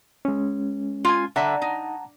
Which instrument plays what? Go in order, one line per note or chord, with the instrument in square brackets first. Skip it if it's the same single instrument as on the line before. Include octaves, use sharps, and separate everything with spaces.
[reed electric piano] G#3 C#4
[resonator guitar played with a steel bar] F4 G#5
[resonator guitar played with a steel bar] D3 E5 [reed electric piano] F#5 A5 A#5
[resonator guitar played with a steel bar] D#4